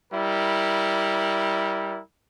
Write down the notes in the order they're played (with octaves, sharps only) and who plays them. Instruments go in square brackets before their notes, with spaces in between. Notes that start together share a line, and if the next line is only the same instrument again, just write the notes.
[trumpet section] G3 E4 A#4